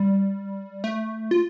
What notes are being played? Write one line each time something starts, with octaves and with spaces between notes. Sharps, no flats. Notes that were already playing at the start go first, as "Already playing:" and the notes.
Already playing: G3
A3
F4